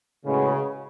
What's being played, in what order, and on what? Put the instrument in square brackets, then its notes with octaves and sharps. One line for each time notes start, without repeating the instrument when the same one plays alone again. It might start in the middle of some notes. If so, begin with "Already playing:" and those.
[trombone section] A2 G#3 C#4 F#4 B4 [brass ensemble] C#3